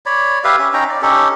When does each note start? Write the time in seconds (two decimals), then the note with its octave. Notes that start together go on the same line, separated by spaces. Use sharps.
0.06 C#5 D5 B5
0.44 G4 B4 E5 F5
0.59 C#4 E5
0.73 C#4 D#4 G5 A#5
0.89 D5
1.02 C#4 D#4 G4 A4